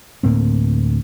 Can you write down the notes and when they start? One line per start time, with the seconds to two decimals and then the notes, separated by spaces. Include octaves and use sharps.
0.23 D2 A2 A#3 C4